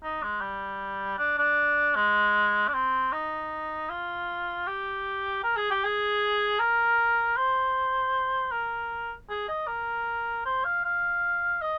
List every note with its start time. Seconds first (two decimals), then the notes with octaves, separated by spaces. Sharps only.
0.03 D#4
0.23 G#3
0.41 G3
1.19 D4
1.38 D4
1.96 G#3
2.68 D4
2.74 C4
3.13 D#4
3.90 F4
4.67 G4
5.44 A#4
5.57 G#4
5.71 G4
5.85 G#4
6.59 A#4
7.37 C5
8.52 A#4
9.30 G#4
9.49 D#5
9.68 A#4
10.46 C5
10.65 F5
10.85 F5
11.62 D#5